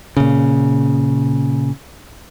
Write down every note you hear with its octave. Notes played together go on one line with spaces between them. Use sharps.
A#2 C#3